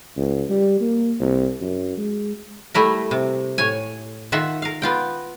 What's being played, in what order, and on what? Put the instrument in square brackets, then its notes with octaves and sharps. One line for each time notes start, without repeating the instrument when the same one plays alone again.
[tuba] C#2
G3
A#3
C2
F#2
G#3
[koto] G3 A3 E4 A#4
C3
A2 C#5 G#5
D#3 F4 E5 F#5
A#4 F5
B3 F4 G5